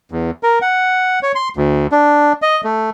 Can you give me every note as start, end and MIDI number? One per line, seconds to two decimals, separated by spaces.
0.12 0.31 40
0.43 0.59 70
0.62 1.19 78
1.23 1.32 73
1.35 1.49 84
1.57 1.87 38
1.92 2.33 62
2.42 2.61 75
2.64 2.90 57